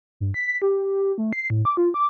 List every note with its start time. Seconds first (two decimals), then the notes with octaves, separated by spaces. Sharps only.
0.20 G2
0.34 B6
0.62 G4
1.18 A3
1.33 C7
1.50 A2
1.65 D6
1.77 F4
1.94 D6